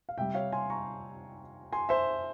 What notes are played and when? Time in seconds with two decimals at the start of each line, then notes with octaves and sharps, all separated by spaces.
0.09 F5
0.17 C3 G3 E5 G5
0.34 C#5 F5
0.52 G#5 C6
0.70 A#5 C#6
1.72 G#5 C6
1.89 C5 E5